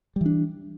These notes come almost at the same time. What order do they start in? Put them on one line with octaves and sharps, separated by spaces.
G3 E3 D4